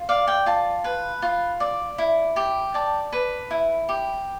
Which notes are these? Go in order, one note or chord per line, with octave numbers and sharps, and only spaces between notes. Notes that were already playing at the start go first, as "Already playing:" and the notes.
Already playing: F4
D5 F5
G5
F4 A5
B4
F4
D5
E4
G4
D5 A5
B4
E4
G4